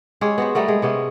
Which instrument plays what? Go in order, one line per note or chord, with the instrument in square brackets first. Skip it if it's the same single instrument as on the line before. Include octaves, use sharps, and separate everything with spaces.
[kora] G#3 C#4 G4 C#5
B3 F#4 C5
G3 A3 B3 A#4
G#3
C3 B3 C#4